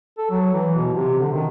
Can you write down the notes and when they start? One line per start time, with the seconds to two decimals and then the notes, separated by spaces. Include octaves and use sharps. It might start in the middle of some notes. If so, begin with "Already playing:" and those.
0.18 A4
0.30 F#3
0.54 E3
0.75 B2
0.94 C3
1.19 D3
1.32 D#3